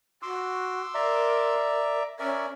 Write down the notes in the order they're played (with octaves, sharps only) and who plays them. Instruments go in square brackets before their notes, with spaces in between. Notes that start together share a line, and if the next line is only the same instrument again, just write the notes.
[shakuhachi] F#4 [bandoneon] C6 D6 E6
[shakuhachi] A#4 [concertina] D5 E5 A#5
[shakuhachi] C#4 [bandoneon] A#4 D5 [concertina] E5